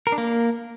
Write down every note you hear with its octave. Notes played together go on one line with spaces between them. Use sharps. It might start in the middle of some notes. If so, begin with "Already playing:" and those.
A#4
D4
A#3